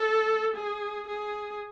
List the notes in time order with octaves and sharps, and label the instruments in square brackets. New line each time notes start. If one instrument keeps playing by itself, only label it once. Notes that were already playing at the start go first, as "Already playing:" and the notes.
Already playing: [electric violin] A4
G#4
G#4